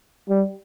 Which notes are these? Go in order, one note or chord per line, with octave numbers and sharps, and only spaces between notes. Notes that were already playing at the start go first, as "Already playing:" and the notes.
G3